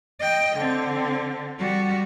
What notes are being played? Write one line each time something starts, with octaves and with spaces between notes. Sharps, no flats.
D#5 G5
D3 C4
G3 F#4